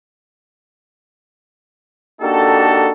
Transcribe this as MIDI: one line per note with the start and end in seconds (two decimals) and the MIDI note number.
2.22 2.90 58
2.22 2.90 62
2.22 2.90 63
2.22 2.90 66
2.22 2.90 67
2.22 2.90 69